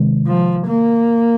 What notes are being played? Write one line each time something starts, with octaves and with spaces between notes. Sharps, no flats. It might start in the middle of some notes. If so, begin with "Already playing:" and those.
Already playing: C3 D#3 G#3
F3
A#3